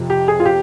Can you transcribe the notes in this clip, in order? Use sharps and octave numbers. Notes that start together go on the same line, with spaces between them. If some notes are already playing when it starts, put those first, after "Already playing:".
Already playing: F2 C3 F3
G4
G#4
F4
G4